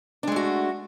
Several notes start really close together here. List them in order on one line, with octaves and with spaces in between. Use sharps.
D4 G#3 A3 F#4